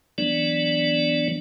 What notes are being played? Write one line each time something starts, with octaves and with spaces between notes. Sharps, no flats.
E3 F#3 B3 D4 D5